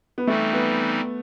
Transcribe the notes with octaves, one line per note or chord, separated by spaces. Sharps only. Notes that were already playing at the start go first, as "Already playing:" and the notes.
B3
E3 G3 A3 C4 D#4
B3